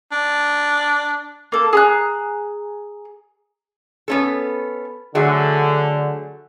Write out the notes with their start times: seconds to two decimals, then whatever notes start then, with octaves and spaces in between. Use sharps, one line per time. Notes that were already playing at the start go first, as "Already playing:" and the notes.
0.12 D4
1.52 A#3 A4
1.73 G#4 A#5 F#6
4.08 B3 C#4 A4
5.15 D3 F#3 A3 G#4